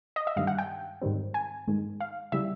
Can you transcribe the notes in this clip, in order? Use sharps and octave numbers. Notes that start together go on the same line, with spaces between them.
D#5
E5
G2 D#3 G3 F5
F#5
G5
G#2 D#3 G3 C4
G#5
G#2 D#3 G#3
F5
C#3 E3 G3 E5